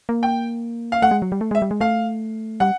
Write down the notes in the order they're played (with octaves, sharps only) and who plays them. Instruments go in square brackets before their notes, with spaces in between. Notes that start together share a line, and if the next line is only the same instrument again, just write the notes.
[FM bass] A#3
[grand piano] G5
F5
[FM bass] A3 [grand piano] F#5
[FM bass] G#3
F#3
G3
A3
[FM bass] G#3 [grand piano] E5
[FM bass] G3
G#3
[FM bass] A3 [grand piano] F5
[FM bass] G3 [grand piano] F#5